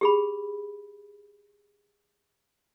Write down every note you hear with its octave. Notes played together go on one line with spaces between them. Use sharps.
G4 G#4 B5